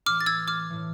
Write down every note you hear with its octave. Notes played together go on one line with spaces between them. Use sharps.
A2 E3 A3 D6 F6
A6
E6 G#6
D6 F6
A2 E3 A3